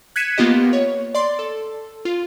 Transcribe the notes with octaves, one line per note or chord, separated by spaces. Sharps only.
F#6 G#6 B6 C#7 D#7 E7
A#3 B3 F4 G4 D#5
C#5
D5 C6
A4
F4